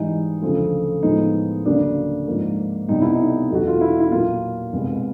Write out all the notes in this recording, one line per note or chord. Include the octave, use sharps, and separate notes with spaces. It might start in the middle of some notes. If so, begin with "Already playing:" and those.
Already playing: G#2 E3 G3 D#4
D2 C#3 F3 A3
A2 F3 G#3 B3 D#4
D2 C#3 F#3 A#3 D4
G#2 F3 A#3
C2 B2 G3 D#4
E4
D#4
E2 B2 F#3 A3 F#4
F4
E4
E4
A#2 F#3 A#3 F4
C2 B2 G#3 B3